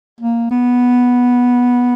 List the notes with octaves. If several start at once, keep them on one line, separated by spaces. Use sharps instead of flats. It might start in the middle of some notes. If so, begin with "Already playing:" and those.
A#3
B3